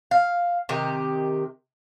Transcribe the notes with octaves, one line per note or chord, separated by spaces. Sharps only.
F5
C3 D#3 G4